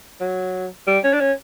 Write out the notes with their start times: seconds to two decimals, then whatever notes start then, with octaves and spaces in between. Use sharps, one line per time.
0.20 F#3
0.87 G3
1.04 C#4
1.13 D4
1.20 C#4